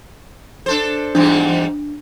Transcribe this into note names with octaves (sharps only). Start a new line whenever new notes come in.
D4 A4 C5
E2 G#2 G3 D4